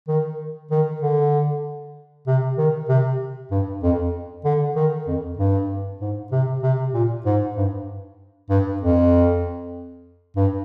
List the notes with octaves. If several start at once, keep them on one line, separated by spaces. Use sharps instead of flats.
D#3
D#3
D3
C3
D#3
C3
G2
F2
D3
D#3
F2
G2
G#2
C3
C3
A#2
G#2
G2
G2
F2
G2